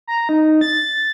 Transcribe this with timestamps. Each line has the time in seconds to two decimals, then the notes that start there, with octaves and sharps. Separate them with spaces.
0.07 A#5
0.29 D#4
0.61 A6